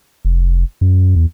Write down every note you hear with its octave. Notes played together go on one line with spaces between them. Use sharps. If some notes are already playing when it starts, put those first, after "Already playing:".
F1
F#2
E2